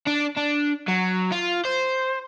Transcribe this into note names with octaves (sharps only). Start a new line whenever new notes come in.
D4
D4
F#3
F4
C5